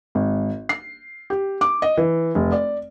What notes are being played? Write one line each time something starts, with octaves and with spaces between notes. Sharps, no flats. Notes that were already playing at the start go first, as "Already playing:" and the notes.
G#1
C7
G4
D6
D#5
E3
F1
D5